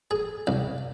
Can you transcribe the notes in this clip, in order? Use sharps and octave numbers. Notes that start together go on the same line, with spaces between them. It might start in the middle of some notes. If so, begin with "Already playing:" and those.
G#4
C2